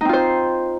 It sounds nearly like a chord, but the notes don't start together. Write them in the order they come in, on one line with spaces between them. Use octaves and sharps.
D#4 C4 F4 C5